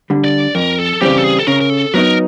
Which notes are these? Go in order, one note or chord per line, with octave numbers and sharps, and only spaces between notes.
D3 G3
D5
F2 A#4
A4
C#3 E3 G3 C4 G4
A4
G#4
A4
C#3 A#4
A#4
A4
F#3 B3 D#4 A#4